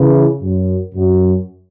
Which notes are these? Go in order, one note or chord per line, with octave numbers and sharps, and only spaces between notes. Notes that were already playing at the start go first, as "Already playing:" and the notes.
Already playing: C#3 E3
F#2
F#2